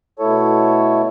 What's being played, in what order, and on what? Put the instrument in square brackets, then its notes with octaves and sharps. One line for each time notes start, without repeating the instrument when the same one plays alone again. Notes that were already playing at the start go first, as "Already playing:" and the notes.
[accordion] B2 A3 E4 A4 C#5